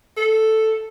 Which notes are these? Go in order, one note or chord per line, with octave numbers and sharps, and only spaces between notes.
A4